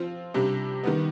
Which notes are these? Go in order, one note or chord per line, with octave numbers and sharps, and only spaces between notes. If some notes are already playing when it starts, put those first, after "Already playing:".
Already playing: F3 C4 F4
C3 G3 D4 G4
D#3 G3 B3